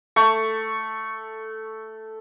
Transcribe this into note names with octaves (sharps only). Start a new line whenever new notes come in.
A3 C#6